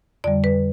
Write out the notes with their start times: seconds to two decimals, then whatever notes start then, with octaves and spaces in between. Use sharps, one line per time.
0.24 F2 D3 G3 D5
0.44 B4